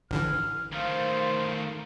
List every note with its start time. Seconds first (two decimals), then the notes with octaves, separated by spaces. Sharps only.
0.11 A1 D3 E3 F6
0.73 D#3 A3 C5 F5